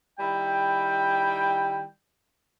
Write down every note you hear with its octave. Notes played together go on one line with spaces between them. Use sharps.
D#3 G3 E4 G5